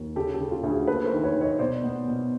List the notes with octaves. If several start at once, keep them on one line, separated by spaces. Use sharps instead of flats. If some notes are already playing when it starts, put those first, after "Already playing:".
Already playing: D#2
C#3 G4 A4
G4 A4
C#3
F4 G4
D2
F#4 G#4
A#3 A4 B4
A#4 C5
D#3
B4 C#5
D#3
C#5 D#5
B2 C5 D5
B3
B2